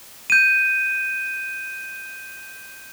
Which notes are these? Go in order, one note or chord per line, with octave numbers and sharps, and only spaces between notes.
G6 D#7